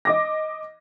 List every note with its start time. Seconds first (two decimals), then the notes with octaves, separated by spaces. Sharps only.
0.05 D#5 D6 A#6